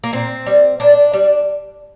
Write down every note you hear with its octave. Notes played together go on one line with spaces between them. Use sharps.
A#3
A#2 C4
G3
A#2 D4
G3